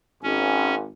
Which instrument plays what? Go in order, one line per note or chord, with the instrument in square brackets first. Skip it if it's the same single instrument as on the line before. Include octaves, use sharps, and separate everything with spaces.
[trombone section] G#1 [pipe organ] C#4